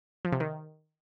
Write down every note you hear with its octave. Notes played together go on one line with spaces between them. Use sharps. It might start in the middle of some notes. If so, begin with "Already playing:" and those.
F3
C3
D#3